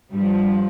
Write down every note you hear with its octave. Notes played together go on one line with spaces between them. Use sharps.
G2 F3 G3